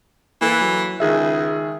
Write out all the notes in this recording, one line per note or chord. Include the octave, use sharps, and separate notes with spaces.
E3 A#3 A4
F#3
C#2 D#3 G#4 E5